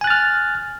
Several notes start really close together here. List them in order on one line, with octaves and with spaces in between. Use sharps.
G#5 F#6 A6 F6